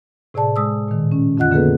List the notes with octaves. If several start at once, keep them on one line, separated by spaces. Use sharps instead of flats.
A2 C3 G#4 D5 A5
G#3 D#6 E6
A#2 D#3
C#4
F2 D3 F4 D#5 F#5 F#6
D3 A#3 B3 G#4 A4 B4